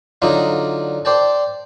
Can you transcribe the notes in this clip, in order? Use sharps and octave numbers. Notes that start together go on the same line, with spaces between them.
D3 F#3 D4 D#4 F4
C5 D5 G5 A5